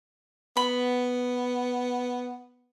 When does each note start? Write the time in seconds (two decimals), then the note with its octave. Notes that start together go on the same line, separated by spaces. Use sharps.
0.57 B3 B5